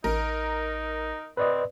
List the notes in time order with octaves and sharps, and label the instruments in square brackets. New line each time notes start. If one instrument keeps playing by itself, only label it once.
[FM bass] A1 [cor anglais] D#4 [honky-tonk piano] A#4
[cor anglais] C4 [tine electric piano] B4 D5 D#5